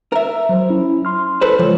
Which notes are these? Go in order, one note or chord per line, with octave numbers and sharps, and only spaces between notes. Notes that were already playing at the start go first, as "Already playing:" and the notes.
A#4 E5
F#3 C5
C#4 E4
C6 F6
A4 B4 C5
C#2 F3 C#5